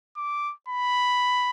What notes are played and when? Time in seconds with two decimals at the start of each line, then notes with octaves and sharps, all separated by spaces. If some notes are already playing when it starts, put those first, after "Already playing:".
0.17 D6
0.69 B5